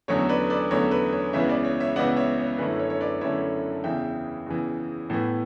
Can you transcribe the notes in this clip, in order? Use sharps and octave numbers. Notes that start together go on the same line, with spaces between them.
E2 D3 F#3 A3 C#4 C#5
B4 D5
B4 D5
E2 D3 F#3 A3 C#4 C#5
B4
C#5
C#2 C#3 E3 B3 C#5 E5
B4 D5
C#5
C#5 E5
C#2 C#3 E3 B3 D5 F#5
C#5 E5
C#5
F#2 D3 A3 C#4 E4 B4
C#5
C#5
B4 D5
F#2 D3 A3 C#4 E4 C#5 E5
A5
E2 C#3 E3 E5 G5
E2 C#3 E3
A2 E3 B3